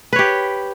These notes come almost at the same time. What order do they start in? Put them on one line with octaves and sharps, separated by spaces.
B4 C#5 G4